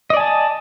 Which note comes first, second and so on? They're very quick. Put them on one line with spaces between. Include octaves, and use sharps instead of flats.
D#5 D5 G#5 A5